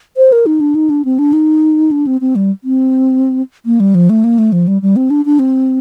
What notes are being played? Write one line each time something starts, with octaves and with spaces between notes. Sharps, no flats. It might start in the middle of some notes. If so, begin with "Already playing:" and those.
C5
A#4
D#4
D4
D#4
D4
C4
D4
D#4
D4
C4
C4
G3
C4
A#3
G3
F3
A3
A#3
A3
F3
G3
G3
C4
D4
D4
C4